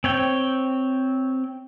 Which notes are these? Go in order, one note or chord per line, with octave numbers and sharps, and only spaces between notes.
C4 C#5 G5